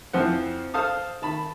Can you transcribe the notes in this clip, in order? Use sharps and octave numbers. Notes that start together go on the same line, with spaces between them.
F2 E3 F3 C4 F#5
A4 C5 F5 A5 D#6
D#3 A5 B5